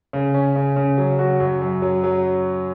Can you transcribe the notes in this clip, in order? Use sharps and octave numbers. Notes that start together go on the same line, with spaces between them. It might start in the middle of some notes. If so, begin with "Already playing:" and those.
C#3
C#4
C#3
C#3
F#3
F#4
F#2
F#2
F#3
F#3